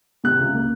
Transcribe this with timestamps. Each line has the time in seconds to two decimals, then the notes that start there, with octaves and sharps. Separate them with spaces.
0.24 C3 F#6
0.39 C#2
0.54 A#3